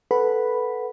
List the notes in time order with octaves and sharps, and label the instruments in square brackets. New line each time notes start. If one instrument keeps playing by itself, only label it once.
[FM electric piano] A4 B4 F#5 B5